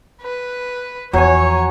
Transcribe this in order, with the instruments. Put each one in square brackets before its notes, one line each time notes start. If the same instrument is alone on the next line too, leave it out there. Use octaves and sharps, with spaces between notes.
[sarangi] B4
[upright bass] E2 F3 [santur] F#3 G#5 [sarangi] C#5